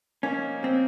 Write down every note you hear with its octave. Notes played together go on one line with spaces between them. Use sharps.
F3 A#3 C#4 D#4
C4